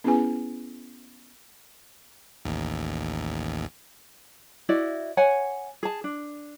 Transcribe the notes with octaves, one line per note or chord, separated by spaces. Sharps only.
B3 C#4 E4 G#4 B4 G#5
A1 D#2
E4 F#4 D5 D#5
C#5 F#5 G#5
G#4 A5
D4